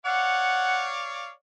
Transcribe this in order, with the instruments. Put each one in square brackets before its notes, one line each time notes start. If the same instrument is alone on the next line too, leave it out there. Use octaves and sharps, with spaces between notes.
[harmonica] C#5 D5 F5 [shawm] F#5